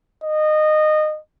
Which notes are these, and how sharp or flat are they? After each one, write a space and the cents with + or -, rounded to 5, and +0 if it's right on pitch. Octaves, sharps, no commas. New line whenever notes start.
D#5 -20